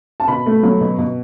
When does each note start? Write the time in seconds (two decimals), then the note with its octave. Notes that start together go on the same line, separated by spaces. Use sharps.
0.20 A5
0.28 B2 B5
0.46 A3
0.63 F#3
0.81 B2
0.98 B2